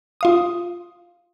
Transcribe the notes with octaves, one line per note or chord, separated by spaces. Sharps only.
F4 F5 D#6